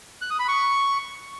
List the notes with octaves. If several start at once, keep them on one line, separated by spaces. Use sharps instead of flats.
F#6
D#6
B5
C#6